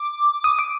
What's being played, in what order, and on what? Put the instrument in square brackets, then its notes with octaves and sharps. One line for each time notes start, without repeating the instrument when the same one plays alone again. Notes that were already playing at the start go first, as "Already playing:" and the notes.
Already playing: [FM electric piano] D6
D#6
D6